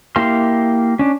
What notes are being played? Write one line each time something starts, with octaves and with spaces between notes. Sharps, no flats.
A#3 E4 G4 F5 C6
C#4 D4